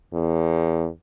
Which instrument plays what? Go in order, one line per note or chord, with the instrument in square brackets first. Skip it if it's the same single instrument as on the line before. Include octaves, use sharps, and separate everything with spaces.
[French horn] E2